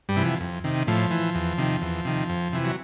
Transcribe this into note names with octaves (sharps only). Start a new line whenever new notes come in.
G2 G3
C3 E3
F3
F2
C3 D#3
A2 F3
E3
E2
C3 D#3
E2
C3 D#3
F2
C3 E3
F#3